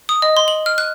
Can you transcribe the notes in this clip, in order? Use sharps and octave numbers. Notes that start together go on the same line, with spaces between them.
D#6
D#5
C6
F#7
F6
F#6